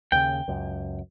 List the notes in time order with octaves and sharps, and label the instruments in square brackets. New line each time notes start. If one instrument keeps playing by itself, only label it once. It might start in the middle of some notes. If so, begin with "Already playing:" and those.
[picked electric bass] D#2 C#3 [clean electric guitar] G5
[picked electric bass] C#2 F#2